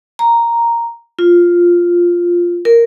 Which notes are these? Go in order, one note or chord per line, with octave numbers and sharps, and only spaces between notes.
A#5
F4
A#4